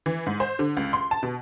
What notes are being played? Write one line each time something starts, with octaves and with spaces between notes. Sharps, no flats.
E3
G#2
C5
D3
C#2
C6
A5
B2